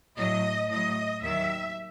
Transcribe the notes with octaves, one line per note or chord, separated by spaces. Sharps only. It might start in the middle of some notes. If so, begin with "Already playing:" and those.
A2 F#3 D#5
A2 F#3 D#5
D#2 D#3 F#3 E5